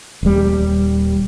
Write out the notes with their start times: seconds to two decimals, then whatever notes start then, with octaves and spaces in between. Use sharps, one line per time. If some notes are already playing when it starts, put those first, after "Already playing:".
0.23 D#1 G3